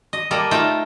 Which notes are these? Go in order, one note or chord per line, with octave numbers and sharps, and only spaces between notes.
D#5
G3 A#3 A4 D#5
A3 D#4 F4 G5